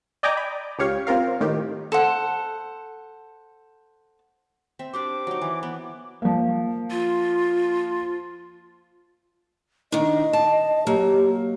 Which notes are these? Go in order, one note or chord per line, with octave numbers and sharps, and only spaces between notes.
D5 D#5 G5 G#5 A#5 D6
B5
C#2 G4 C#5 F5 C#7
C4 F4 A#4 F5
A2 D#3 G4
A4 C5 F#5
C4 E5
D4 G4 C5 D6
F#3 D#4
E3
B3
F3 A#3
F4
D#3 D4 D#5
A5
F#3 A#3 G4